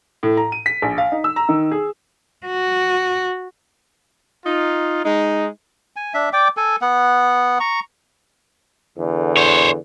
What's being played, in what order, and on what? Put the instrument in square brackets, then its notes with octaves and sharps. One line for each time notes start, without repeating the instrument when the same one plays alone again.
[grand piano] A2
A#5
D#7
B6
A#1
F5
D#4
E6
A#5
D#3
G#4
[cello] F#4
[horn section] D#4 F4
G#3 D#4
[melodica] G#5
D4 E5
D5 G5 D6
A4 G#5
B3 F#5
A#5 C#6
[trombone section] E2 D3
[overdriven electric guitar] C5 C#5